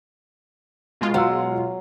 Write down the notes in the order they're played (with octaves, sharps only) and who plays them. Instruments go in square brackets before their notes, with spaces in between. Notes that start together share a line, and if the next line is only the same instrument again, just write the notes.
[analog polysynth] B2 G#3 F4
[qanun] F#3 [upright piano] F5 F#5 E6